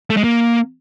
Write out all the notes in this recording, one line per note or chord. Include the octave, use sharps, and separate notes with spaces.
A3
G#3
A#3